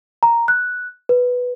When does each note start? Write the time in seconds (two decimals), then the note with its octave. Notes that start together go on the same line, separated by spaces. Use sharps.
0.23 A#5
0.48 F#6
1.09 B4